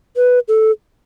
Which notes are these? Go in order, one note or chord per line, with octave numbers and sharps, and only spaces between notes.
B4
A4